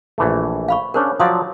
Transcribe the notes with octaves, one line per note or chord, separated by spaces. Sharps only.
A#1 E3 A3
F5 B5 C#6
C#4 D4 G#4 A#4 C5 C#5
F3 F#3 D5 F5 C6 D#6